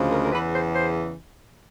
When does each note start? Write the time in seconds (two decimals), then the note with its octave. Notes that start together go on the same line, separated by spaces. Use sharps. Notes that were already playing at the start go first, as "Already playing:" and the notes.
Already playing: D2 C#3 F3 G#3
0.11 A#4
0.25 A#4
0.32 E2 C#3 E3 B4
0.53 C5
0.74 C5